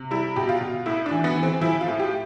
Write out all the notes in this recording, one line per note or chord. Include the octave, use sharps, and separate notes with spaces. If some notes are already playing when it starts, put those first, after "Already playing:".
Already playing: C3
G3 E4
B2 G4
F4
B2
A2 E4
D4
E3
B3
E3
C4
F3 E4
F4
A2
G4